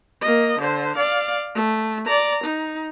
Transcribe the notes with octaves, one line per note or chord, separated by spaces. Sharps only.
A#3 D#5
D3 C5
D5 F5
A3
D5 A#5
D#4